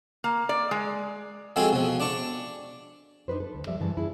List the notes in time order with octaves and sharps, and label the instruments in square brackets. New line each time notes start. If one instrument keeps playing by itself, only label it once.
[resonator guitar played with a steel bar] A#3
D5
G#3
[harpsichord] F3 G#3 C4 F#4 G#4 A4
B2 F3
D4 D5 A5 C#6
[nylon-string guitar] D4 D#4 G4 B4 C5
A4
D2
F3 G3 D5 E5
G2 C#3 E3 G#3 C#4 A5
E4 G#4